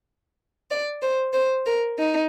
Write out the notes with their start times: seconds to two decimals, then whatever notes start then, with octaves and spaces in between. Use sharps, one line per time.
0.70 D5
1.01 C5
1.33 C5
1.65 A#4
1.98 D#4